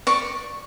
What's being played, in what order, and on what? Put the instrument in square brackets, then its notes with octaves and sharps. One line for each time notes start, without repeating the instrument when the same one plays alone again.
[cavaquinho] D5 C#6